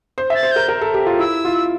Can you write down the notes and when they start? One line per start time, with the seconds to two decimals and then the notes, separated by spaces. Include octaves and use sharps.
0.18 C5
0.30 E5
0.35 A6
0.43 C5
0.52 A#4 G6
0.68 A#4
0.81 A4
0.94 G4
1.07 F4
1.19 E4 E6
1.45 F4